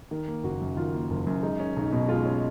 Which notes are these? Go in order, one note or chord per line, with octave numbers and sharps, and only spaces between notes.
D#3 A#4
A#3
F#1 F#4
F#2
D#3 F4
A#3
F#1
F#2
G#3 D#4
C#4
B1 D#4
B2
G#3 F4
C#4